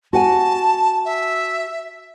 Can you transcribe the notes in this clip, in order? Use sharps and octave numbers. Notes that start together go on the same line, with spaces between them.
F#4 F#5 G#5 A5
E5